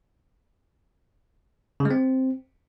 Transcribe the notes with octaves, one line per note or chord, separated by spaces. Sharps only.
C#3
G#3
C4